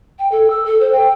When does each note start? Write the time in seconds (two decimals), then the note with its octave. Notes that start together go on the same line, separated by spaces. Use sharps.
0.19 G5
0.32 A4
0.50 E6
0.66 A4
0.81 C5
0.92 G5